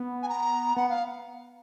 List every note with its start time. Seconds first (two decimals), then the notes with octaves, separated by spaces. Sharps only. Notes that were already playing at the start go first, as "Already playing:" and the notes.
Already playing: B3
0.23 G#5
0.29 A#5
0.76 B3 F#5
0.89 F5